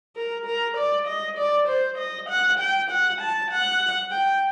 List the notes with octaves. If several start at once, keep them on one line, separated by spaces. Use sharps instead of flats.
A#4
A#4
D5
D#5
D5
C5
D#5
F#5
G5
F#5
A5
F#5
G5